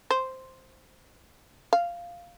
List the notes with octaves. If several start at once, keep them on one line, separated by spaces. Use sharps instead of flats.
C5
F5